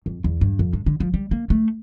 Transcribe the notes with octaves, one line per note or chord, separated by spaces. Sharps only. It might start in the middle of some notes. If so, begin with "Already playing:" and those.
F2
E2
G2
F2
G2
D3
F3
G3
A#3
A3